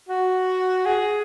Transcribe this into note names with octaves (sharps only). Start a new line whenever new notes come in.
F#4
G#4